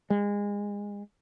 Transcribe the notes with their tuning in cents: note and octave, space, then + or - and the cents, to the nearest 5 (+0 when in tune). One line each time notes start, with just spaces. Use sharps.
G#3 -25